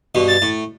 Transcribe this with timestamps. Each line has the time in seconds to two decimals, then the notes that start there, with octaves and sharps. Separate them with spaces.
0.15 G2 B2
0.28 A6
0.42 A2